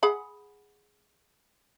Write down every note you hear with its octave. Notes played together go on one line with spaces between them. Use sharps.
G#4 F#5 B5